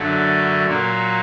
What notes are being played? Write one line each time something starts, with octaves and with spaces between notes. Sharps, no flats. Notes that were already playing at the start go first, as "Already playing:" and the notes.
Already playing: F#2 D3 F#3 A3
A#2 F#3 A#3